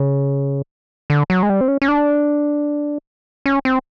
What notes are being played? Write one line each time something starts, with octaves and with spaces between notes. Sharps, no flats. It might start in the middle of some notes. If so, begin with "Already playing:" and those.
Already playing: C#3
D3
F#3
G#3
G3
C4
C#4
C#4
D4
C#4
C4